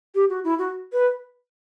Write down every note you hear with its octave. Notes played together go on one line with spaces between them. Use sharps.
G4
F#4
E4
F#4
B4